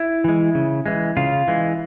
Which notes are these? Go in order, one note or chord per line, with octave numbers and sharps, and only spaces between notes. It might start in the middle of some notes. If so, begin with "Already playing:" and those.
Already playing: E4
E3 G#3
C#3
E3 G#3
C#3 F4
E3 G#3